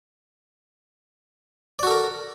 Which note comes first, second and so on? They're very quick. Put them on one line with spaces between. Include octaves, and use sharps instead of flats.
D5 F#4 A4 A#4